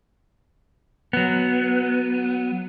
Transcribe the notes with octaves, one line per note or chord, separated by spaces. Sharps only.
F#3 B3